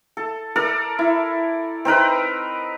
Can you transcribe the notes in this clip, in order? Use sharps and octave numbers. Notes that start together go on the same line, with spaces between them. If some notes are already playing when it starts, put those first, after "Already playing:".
A4
A4 A#4 D5
E4
C4 D#4 A#4 B4